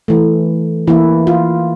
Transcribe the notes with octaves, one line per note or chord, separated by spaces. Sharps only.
E3 A3
E3 A#3 E4
F4